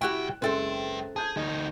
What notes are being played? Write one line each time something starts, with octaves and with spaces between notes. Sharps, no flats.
C2 E4 F#4 G4 G5 C#6 F#6 E7
F#1 G#3 C4 A4 B4 C5 E5 G5
G#4 A5 G6 G#6
D2 D#4